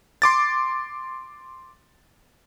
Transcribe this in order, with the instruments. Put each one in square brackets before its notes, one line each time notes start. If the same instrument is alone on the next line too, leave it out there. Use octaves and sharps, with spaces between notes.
[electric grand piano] C6 D6 A6